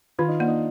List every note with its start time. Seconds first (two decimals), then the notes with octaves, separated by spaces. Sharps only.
0.19 D#3 F4
0.28 D#4
0.39 A#3 D4
0.48 D#4